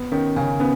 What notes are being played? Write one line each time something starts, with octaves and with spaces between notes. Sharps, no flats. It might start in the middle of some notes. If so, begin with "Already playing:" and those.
Already playing: B3
D#3 C#4
C#3 G#5
B3 C#4